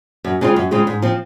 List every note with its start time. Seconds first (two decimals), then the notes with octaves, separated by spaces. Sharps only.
0.24 F#2
0.41 C#3 G#3 C4 F4
0.56 F#2
0.71 C#3 G#3 C4 F4
0.87 G#2
1.02 F3 C4